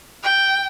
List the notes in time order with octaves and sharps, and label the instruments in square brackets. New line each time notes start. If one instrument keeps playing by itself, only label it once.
[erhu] G5